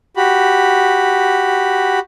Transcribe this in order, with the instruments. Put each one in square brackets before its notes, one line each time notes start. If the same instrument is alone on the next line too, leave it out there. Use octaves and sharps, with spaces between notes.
[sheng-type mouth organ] F#4 G4 B5